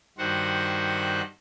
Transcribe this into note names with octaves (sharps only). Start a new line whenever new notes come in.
G2 D#3 F#4 C5 F#5